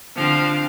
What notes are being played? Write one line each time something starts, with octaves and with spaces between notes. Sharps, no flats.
D3 F3 C4 F5